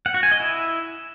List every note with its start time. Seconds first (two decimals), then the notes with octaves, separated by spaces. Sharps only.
0.06 F#5
0.14 F#4
0.23 G#5
0.32 D#5
0.40 E4